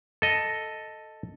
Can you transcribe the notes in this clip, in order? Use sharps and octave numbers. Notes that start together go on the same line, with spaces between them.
A4 D#5